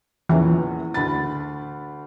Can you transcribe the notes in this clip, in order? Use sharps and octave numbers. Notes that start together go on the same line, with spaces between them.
E2 A#2 E3 C#4
D2 B5 A6